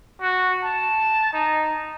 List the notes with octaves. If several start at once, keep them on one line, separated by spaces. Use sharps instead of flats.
F#4
A5
D#4